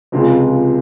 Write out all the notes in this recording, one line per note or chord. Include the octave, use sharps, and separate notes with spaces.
C#2 C3 F3 G#3